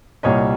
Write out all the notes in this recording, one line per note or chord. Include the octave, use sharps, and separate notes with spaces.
C2 A#2 G3 C#5 D#5